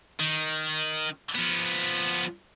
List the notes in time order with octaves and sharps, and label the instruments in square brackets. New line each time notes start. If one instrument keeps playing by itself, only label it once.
[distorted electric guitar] D#3
F3 B3